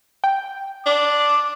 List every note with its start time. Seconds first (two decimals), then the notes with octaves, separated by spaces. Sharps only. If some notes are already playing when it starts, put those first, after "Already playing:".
0.24 G5
0.86 D4 D6